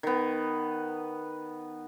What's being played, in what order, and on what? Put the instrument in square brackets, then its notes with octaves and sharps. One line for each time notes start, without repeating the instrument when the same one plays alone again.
[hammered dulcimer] D#3 B3